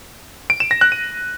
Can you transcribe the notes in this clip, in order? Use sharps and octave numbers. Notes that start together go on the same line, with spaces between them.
D7
E7
A#6
F#6
D#7